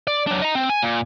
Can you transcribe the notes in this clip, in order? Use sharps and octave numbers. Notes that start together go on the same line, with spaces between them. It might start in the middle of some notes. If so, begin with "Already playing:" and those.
D5
F#3 D4
D#5 A#5
C4
G#5
A#2